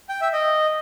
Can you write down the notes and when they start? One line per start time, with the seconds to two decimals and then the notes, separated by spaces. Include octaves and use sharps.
0.09 G5
0.21 E5
0.33 D#5